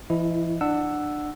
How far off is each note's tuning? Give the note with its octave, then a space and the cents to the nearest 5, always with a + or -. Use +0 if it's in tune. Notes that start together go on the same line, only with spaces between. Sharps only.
E3 +40 E4 +0 D#5 +0
D4 +25 F#5 +0 E6 +0